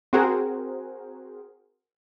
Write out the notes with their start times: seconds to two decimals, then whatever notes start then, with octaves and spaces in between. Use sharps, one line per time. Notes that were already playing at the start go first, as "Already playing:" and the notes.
0.13 C4 F#4 G#4 A#4 C5